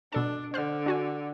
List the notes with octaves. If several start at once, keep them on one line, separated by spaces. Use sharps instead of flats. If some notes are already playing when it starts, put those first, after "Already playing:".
B2 D4 A4 A5
D3 C5 F6
D4 F#4 G#5